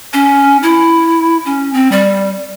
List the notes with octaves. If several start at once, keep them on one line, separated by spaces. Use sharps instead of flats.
C#4
E4
C#4
C4
G3